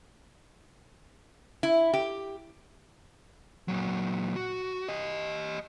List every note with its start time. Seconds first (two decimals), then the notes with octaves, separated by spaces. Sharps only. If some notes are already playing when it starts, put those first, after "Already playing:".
1.63 E4
1.93 G4
3.68 A#2 F#3
4.36 F#4
4.88 G4 D#5